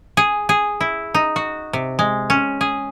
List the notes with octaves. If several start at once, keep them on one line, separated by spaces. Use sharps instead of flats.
G#4
G#4
E4
D#4
F#4
C3
G#3
C#4
G#4